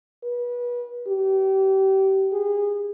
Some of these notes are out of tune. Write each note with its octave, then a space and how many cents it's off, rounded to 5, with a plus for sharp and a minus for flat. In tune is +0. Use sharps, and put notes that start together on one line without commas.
B4 -30
G4 -30
G#4 -30